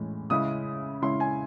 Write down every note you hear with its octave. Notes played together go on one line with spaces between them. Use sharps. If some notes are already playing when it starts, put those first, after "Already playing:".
Already playing: A2 E3 G#3 C#4
C#3 G#3 C#4 E4 D#6
C#3 G#3 C#4 E4 C6
G#5